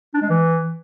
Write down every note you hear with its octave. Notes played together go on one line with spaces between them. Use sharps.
D4
G#3
E3